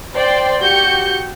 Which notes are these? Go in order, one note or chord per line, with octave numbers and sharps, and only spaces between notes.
C5 D5 G5 C6
F#4 G4 G6 C#7